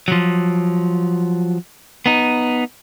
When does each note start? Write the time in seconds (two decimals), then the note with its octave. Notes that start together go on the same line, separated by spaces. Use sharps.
0.08 F3 F#3
2.06 B3 D#4